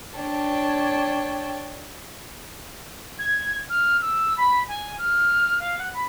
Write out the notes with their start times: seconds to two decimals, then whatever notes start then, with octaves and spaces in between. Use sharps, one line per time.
0.16 D4 C#5 G5 A5
3.19 G#6
3.70 F6
4.02 E6
4.37 B5
4.68 G#5
4.98 F6
5.60 F5
5.79 F#5
5.93 B5